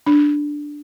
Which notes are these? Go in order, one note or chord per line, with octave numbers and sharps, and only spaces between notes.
D4